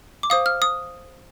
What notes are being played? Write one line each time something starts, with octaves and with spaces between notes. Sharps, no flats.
D6
C5 F5 D#6
F6
D#6